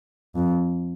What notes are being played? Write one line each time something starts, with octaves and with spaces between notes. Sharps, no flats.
F2